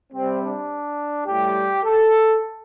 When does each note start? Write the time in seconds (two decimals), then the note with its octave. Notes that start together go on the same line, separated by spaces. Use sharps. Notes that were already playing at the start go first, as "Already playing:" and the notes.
0.13 C3 G3 C4
0.42 D4
1.27 A2 G3 G4
1.84 A4